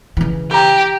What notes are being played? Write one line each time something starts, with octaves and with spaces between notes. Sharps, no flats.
C#3 E3
G4 G5 A#5